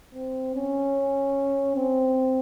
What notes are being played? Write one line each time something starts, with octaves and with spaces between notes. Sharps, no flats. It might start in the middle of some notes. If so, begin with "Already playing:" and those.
C4
C#4
C4